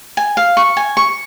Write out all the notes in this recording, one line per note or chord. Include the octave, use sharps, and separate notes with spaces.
G#5
F5
C#6
G#5
C#6